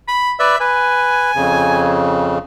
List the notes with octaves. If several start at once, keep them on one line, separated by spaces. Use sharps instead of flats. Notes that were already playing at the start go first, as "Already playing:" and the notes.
B5
B4 D5 E5
B4 G#5
F2 C#3